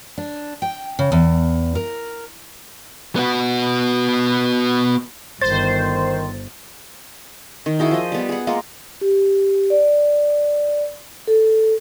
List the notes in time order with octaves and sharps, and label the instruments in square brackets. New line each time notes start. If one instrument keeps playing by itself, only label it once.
[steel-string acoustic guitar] D4
G5
C#3
E2
A#4
[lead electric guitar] B3 F#4
[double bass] G1 [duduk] D#3 [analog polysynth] C5 [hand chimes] A6
[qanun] D#3
E4 F#4 G#4 G5
F3 D#5
G3 B3
G#4 F#5
G#3 A#3 F4 A#4
[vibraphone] G4
D5
A4